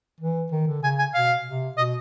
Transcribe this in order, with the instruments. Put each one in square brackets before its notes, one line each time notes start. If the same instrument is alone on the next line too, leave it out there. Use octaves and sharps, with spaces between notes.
[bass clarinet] E3
D#3
D3
[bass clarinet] C#3 [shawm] G#5
[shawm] G#5
[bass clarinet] B2 [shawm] F5
[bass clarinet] C3
[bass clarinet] B2 [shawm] D#5